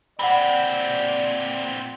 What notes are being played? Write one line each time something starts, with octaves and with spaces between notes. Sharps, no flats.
A#2 C4 D5 F#5 B5